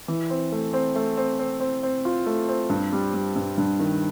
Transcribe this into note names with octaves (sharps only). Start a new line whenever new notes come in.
E3
C4
A3
C4
A3
C4
C4
C4
C4
F4
A3
C4
G2
G3
G3
G2
G2
D#3